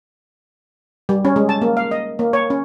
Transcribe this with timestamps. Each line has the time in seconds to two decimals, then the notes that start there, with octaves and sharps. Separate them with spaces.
1.09 G3
1.25 C#4
1.36 G#3
1.49 A5
1.61 A#3
1.77 F5
1.91 D#5
2.19 A#3
2.33 C#5
2.50 C#4